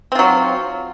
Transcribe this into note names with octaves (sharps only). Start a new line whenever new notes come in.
F#3 C4 F4